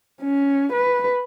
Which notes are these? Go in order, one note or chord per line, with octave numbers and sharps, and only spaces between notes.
C#4
B4